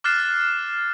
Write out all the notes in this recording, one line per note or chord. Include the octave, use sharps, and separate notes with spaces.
D6 F6 F#6 A6 C7 E7